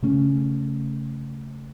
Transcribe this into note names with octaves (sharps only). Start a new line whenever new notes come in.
C#3 A3 C#4